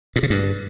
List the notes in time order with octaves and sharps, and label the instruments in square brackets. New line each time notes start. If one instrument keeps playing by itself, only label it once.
[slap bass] A#2
C#3
G2